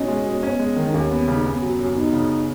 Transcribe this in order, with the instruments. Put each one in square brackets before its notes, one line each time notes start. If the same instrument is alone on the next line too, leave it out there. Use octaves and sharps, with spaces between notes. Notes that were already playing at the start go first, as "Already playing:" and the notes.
Already playing: [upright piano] B2 D#4 [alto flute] C#4
[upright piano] G#3
B2
[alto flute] B3 [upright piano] C#4
[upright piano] G#3
D#3
[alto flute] D#4
[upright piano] D#2 [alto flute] C#4
[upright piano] B3
C#3
[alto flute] D#4
[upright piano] B3 [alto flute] C#4
[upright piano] F#3
F#2
[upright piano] B3 [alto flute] D#4
[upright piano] C#3